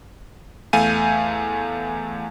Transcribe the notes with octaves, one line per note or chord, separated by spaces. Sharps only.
E2 A3 F5 G#5 G6 D#7